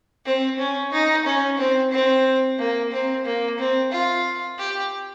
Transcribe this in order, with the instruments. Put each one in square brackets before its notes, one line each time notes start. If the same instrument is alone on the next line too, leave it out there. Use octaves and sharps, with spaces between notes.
[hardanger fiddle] C4
C#4
D#4
C#4
C4
C4
A#3
C4
A#3
C4
F4
G4